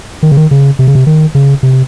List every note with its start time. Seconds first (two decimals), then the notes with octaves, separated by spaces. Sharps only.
0.23 D#3
0.32 C#3
0.37 D#3
0.51 C#3
0.79 C3
0.87 C#3
0.95 C3
1.07 D#3
1.35 C#3
1.63 C3